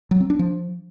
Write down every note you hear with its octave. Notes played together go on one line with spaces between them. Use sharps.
F#3
C4
D4
F3